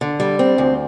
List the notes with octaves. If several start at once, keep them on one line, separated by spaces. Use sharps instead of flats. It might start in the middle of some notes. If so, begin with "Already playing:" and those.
D3
G3
C4
D2